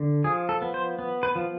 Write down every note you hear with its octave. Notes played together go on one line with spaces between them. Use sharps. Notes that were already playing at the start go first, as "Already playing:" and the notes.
Already playing: D3
F3 G#4
A4
B3
C5
B3
B4
F3